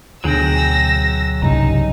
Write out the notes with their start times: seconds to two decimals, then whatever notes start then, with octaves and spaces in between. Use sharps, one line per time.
0.24 D2 B2 D3 F#3 G#4 G5 E6 A#6
1.42 C2 G2 C#3 D#4 A#5